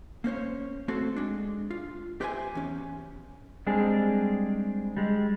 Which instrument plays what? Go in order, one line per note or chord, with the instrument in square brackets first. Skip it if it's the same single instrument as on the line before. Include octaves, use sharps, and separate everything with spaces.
[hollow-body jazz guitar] A#3 C#4 C5 C#5
A3 C4 F#4 A4 C5
G#3 D4
F4
G4 B4 C5 E5 F5 G#5
E2 C#4
[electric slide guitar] G3 G#3 C4 D4 G#4
G3 G#3